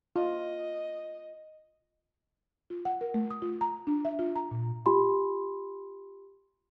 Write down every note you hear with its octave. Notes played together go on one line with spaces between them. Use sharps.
F4 D#5
F4
F#5
A#4
A3
D#6
F4
A#5
D4
E5
F4
A#5
A#2
F4 G4 G#5 B5 C6